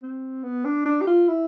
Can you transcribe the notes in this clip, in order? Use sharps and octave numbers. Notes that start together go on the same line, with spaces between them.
C4
B3
D4
D4
G4
F4
E4